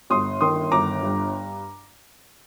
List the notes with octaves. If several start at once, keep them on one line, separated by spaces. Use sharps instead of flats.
G1 C6 D#6
D#3 C6 D#6
G1 A#5 D6
G2